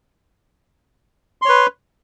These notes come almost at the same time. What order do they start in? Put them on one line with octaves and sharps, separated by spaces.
C6 C#5 B4